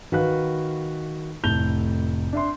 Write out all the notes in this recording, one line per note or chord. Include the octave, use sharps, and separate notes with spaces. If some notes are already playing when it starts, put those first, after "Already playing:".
D#3 F#4 B4 F5 F#6
F1 A2 A5 G6 F7 G7
D4 E5 C6